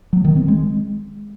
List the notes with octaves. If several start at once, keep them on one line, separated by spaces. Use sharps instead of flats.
F#3
D#3
C4
G#3